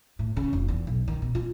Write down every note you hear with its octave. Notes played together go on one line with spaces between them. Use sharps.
A2
C#3
F1
E2
B1
D#3
B2
F4